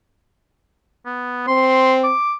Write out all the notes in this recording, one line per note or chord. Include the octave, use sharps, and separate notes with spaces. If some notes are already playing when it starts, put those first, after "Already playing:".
B3
C4 C6
D6